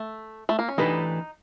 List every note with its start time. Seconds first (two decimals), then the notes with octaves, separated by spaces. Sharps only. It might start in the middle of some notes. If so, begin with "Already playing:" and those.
Already playing: A3
0.49 A3
0.59 A#3
0.69 C#4
0.78 E3 A3 D4 D#4 G4 B4